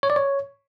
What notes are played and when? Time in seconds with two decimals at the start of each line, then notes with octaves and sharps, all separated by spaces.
0.03 C#5
0.10 D5
0.16 C#5